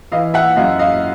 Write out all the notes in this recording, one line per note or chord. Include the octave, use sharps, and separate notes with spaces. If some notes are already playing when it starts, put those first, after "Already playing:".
E3 D#5 F5
E5 F#5
F#2 D#5 F5
D#5 F5